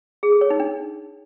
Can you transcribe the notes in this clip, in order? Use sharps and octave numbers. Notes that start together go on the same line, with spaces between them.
G#4
A4
C#5
D#4
D4